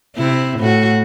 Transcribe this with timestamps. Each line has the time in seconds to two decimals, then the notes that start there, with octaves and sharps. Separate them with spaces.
0.15 C3 E4
0.59 A2 F#4